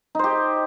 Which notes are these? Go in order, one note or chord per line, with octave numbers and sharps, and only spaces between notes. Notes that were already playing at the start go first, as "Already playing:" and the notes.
D#4 G4 C5